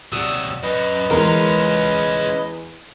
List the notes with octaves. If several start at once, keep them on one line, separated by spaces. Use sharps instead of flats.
C3 F#3 F#4 D5 D#6 E6
F#2 B4 D#5
E2 G#3 C#4 F4 A#4